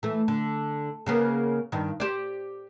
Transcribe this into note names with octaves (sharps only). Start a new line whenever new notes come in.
E3 A3
D3
C#3 A#3 B3
G2 D#3
G4 C5 D5